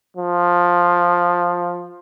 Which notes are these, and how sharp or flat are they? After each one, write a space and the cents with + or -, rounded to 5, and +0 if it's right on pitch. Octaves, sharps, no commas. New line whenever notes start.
F3 +10